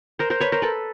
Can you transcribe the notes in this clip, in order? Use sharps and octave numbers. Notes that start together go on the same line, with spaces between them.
A#4 C5
A#4 C5
B4 C#5
A#4 C5
A4 B4